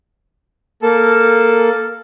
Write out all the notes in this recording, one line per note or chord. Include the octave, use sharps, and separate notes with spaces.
A#3 A4 A5